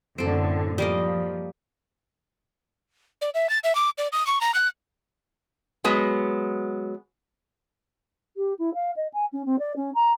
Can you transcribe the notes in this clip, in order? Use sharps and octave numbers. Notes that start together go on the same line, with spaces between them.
F#2 A2 D3 C4 A4
F3 G3 A#3 D#5
D5
E5
A6
E5
D6
D5
D#6
C#6
A#5
F#6
F#3 G#3 B3
G4
E4
F5
D#5
G#5
C#4
C4
D5
C#4
A#5